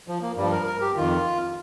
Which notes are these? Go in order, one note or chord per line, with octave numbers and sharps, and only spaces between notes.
F3
A#3
G2 F3 G3
A#4
A#4
G4
F2 D#3 F4